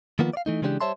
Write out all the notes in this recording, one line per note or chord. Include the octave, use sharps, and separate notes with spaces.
D#3 F3 A#3 B3 F4
D5 F5
E3 A3 D#4
C#3 E3 G#3 B3 D4 G4
G3 C5 C#5 E5 A5 C6